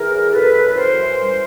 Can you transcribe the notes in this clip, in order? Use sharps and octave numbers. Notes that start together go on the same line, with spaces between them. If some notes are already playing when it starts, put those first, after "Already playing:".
Already playing: E3 G#4 A#4
F#2
F#2 A4 B4
E3
F#2 A#4 C5
E3
G3